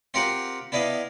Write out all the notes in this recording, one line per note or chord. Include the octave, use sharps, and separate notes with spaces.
C4 F4 G4 A#4 C5 F#5
B3 D4 E4 D#5 F5